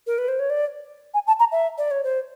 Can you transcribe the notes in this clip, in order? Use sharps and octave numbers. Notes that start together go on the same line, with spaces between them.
A#4
B4
C5
C#5
D5
G#5
A5
A#5
E5
D5
C#5
C5